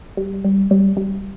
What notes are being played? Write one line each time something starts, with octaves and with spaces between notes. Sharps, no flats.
G3
G3
G3
G3